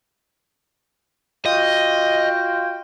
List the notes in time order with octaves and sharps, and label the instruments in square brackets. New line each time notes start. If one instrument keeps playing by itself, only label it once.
[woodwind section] F4 F#4 G5 [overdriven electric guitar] D#5